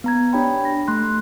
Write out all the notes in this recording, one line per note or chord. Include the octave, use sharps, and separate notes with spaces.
B3 A#5 G#6
D4 G4 C#5 G5 B5
A#6
A3 C6 F#6